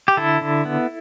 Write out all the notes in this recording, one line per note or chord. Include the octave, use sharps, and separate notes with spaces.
G4
D3 E4 A4
D3
B3